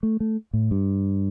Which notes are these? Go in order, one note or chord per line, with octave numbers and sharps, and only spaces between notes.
A3
A3
A2
G2